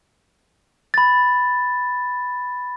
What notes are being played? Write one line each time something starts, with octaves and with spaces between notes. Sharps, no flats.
B5 A6